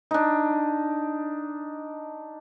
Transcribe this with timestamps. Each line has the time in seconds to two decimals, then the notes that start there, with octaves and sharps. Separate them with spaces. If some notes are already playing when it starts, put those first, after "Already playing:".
0.11 D4 D#4